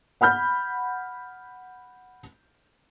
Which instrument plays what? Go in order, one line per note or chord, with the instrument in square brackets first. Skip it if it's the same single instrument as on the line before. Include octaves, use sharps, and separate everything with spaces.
[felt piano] F#5 B5 F6 G6